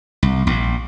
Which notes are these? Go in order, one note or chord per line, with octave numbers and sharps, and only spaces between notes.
C2
A#1